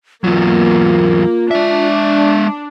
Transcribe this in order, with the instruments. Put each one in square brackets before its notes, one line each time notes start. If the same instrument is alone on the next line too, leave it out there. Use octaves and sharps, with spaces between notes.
[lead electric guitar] E2 F#3 [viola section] A#3 [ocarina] F4
[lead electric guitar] G#3 E5 [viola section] D4